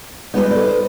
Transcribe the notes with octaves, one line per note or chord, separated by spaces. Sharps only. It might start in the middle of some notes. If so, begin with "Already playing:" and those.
G3 G#3 B3 D#4 B4
A4 D5
C5